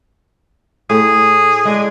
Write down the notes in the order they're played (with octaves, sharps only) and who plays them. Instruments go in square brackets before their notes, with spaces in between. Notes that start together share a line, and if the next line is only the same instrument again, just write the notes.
[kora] A2 [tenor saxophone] G#4
[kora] G#3 D4